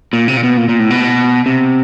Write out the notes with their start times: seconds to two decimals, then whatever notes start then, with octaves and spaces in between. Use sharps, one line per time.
0.13 A#2
0.28 C3
0.37 A#2
0.43 B2
0.57 A#2
0.69 A#2
0.79 A2
0.90 B2
1.46 C3